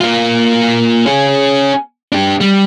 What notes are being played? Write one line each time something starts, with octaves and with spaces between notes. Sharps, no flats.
A#3 F4
C#4 G#4
D4 G4
G3